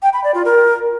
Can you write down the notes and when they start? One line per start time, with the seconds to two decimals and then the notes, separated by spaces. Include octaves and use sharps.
0.03 G5
0.13 B5
0.24 D5
0.34 F4
0.45 A#4